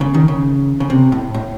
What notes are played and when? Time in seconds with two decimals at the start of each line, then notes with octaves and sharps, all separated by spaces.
0.01 C#3
0.14 D#3
0.28 C#3
0.80 C#3
0.90 C3
1.12 A2
1.34 A2